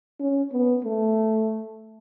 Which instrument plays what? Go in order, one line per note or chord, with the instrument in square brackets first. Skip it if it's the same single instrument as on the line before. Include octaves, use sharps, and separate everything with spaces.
[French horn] C#4
B3
A3